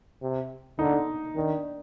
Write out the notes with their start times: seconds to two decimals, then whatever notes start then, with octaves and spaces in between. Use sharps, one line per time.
0.22 C3
0.79 D3 D#4
1.36 D#3 D4